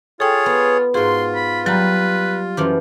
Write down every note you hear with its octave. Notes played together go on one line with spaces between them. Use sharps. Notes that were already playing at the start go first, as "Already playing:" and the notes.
F4 G#4 A4 C#5 G5
B3
G#2 F4 F#4 G#4 C6
B5
F#3 G3 B4 A#5
F#2 E3 F3 D6